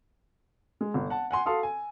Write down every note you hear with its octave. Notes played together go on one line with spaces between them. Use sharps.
G#3
G1
F#5 A5
F#5 G#5 C6
F#4 A4 F5 C6 D#6
G#5